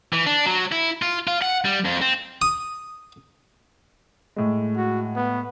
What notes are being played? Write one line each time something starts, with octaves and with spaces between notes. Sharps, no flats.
E3
D4
F#3
E4
F4
F4
F#5
G3
F2
C4
D#6
A2 G#3
F#4
B3